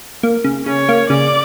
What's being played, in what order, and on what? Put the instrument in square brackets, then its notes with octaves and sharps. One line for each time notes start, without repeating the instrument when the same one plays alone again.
[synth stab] A#3
C#3
[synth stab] C#3 [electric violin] C#5
[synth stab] A#3
[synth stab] C#3 [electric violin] D5